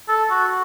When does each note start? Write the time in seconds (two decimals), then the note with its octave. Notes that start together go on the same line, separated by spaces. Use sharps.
0.09 A4
0.31 F#4